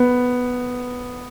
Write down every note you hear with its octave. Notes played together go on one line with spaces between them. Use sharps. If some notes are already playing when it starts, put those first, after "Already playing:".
Already playing: B3